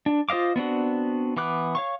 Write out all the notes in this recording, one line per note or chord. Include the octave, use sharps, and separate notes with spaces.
D4
F4 C5 D#5 F5 D6
B3 C4 D4 F#4
E3 B3 D6 F#6
C#5 F5 C#6